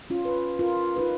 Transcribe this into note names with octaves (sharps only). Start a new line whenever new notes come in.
C#4 F4
B4
F4 A#4
D#4 F4 B4